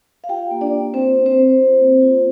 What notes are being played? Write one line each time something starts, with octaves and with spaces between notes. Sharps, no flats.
F5
F4 G4 G5
A#3
D4 D5
F4
A#3 C4 C5
D4
C4 C5
D4
F4
A#3
F4